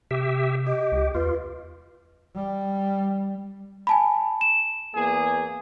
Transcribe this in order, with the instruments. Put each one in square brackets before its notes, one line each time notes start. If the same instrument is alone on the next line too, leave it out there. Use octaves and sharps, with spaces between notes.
[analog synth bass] C3 [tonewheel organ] G4 E5
[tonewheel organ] G4 [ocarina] D#5
[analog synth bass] C#2
[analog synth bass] E2 [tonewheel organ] F4 [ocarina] B4
[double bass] G3
[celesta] G#5 A5 B5
E7
[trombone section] E2 A#3 G#4